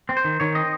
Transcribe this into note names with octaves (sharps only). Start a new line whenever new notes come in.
C4
C5
D#3
D#3 C#5
C4 D#5